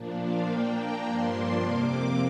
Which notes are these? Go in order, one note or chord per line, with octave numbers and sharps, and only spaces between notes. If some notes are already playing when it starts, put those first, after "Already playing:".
Already playing: A#2 F3 A#3 D4
F5
A#2 A#3 D4 G5
A#5
G2 F3 A#3 D4 C6
F2 C3 A#3 D6
D6